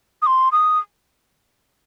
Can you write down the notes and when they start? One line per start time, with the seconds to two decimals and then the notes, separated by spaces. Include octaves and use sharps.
0.22 D#6
0.26 C6
0.52 D#6